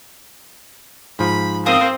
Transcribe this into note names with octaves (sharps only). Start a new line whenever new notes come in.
G#2 F3 B5
C4 A#4 C5 F5 D#6